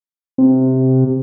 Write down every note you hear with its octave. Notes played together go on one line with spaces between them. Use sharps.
C3